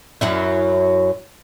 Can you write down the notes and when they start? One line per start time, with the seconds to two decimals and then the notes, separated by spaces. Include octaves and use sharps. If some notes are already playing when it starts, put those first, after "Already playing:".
0.21 F#2 F#3 E4